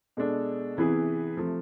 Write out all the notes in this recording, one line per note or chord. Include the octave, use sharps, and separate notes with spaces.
B2 G#3 D4 A4
C3 E3 B3 E4 G#4
C3 F3 A3